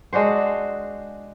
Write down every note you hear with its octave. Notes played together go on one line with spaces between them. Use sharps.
G#3 D4 F#4 C5